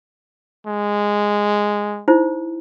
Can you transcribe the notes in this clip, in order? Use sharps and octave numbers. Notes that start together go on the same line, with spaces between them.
G#3
D#4 E4 C5